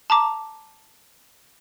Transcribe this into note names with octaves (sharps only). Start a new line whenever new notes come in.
A5 A#5 D6